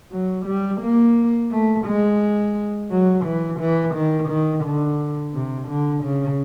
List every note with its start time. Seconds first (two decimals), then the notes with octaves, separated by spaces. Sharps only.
0.11 F#3
0.46 G3
0.81 A#3
1.51 A3
1.86 G#3
2.90 F#3
3.25 E3
3.59 E3
3.95 D#3
4.29 D#3
4.64 D3
5.33 C3
5.68 D3
6.03 C#3